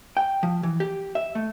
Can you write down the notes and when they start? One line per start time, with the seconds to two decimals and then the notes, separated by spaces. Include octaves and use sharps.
0.17 G5
0.43 F3
0.63 E3
0.80 G4
1.15 E5
1.35 A3